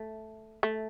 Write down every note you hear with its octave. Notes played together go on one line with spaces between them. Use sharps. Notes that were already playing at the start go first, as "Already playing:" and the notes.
Already playing: A3
A3